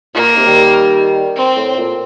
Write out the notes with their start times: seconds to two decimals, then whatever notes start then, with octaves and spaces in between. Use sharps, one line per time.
0.15 A#2 A#3
0.35 C3 D#3
0.45 D#3 G3
1.37 C4
1.57 A2
1.77 A#2